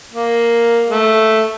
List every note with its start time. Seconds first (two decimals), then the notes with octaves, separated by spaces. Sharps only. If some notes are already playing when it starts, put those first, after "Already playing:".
0.12 A#3
0.88 A3